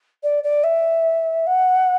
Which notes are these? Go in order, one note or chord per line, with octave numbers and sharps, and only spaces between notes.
D5
D5
E5
F#5